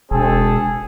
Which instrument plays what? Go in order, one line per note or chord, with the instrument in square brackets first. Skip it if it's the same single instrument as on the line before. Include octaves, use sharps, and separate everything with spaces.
[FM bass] E1 [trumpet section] C4 G#4 A4